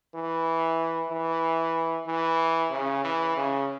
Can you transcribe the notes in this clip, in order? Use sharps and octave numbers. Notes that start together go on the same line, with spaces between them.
E3
E3
E3
C#3
E3
C#3